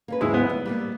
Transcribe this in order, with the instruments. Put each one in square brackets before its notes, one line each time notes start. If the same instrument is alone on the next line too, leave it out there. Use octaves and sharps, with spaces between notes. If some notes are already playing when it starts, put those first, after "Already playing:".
[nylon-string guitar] A#3 C#4 B4
[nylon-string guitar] D#2 G#2 C#3 [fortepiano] G#3 E4
[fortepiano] B3
[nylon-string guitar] D2
G3 A3 A#3